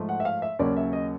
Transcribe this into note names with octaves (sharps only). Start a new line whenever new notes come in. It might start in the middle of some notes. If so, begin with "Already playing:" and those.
Already playing: G#2 F3 A3
F#5
E5
F5
E5
D#2 C#3 F#3 A#3 C#4 D5
E5
D#5